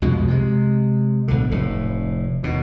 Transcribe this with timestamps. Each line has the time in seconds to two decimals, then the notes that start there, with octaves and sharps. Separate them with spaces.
0.02 C2 F2 B2 G#3
0.28 C3 G#3
1.28 B1 A2 D3
1.51 F1 A2
2.43 D#2 B2